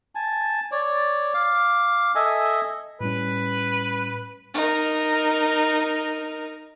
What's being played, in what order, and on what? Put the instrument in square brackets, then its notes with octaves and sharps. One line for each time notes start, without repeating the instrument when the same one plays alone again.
[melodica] G#5 A5
C#5 D5
F5 D6
A4 D#5 E5 G#5
[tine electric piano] A2 G3 C#4 [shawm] B4
[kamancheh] D#4 A#4